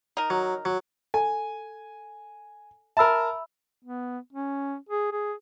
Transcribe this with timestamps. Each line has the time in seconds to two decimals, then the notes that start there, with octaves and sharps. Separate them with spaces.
0.17 D#4 A#4
0.30 F#3
0.65 F#3
1.14 A4 G#5
2.97 A#4 E5 A5 B5 E6
3.83 B3
4.33 C#4
4.89 G#4
5.12 G#4